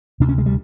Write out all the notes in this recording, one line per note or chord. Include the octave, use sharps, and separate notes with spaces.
D2 C3 D4
C#4
G#3
G3